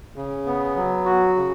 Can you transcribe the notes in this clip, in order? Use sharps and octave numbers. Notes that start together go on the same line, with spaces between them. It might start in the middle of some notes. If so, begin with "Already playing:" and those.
C#3
B3
F#3
F#4
C#3